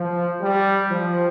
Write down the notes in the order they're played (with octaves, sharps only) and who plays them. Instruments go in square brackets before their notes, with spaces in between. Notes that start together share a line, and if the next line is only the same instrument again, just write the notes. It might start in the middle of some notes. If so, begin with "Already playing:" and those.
Already playing: [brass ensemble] F3
G3
F3